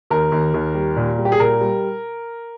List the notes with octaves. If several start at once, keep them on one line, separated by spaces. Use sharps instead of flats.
D#2 A#4
D#2
D#2
G3
A#2
G3
G4
G#4
A#2 A#4
G3